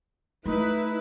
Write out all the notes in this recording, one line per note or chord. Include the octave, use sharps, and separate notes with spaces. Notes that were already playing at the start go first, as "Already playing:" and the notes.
A3 D#4 E4 B4